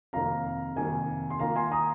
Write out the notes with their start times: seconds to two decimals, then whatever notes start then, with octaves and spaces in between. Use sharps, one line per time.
0.13 F2 C3 D#3 A#3 F5 A#5
0.76 F2 C3 D#3 A#3 G#5
1.30 C6
1.39 D#3 A#3 F4 F5 A#5
1.56 G#5 C6
1.72 A#5 D#6